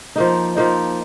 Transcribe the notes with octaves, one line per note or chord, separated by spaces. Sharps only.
F3 A#3 D#4
F3 A#3 D#4